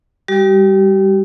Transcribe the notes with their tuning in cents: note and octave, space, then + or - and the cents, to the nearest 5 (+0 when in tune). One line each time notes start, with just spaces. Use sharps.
G3 +15 G4 -35